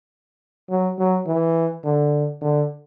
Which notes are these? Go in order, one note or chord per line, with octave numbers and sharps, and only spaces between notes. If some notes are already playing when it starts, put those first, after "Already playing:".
F#3
F#3
E3
D3
D3